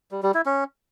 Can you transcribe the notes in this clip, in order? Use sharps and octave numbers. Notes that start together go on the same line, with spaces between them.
G3
G3
E4
C#4